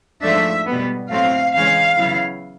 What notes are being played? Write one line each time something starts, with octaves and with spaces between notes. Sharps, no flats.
G#2 F3 A3 D4 E5
B2 G3 B3
A2 F#3 A3 C4 F5
C#3 E3 G#3 C#4 F5
C#3 F#3 B3 E4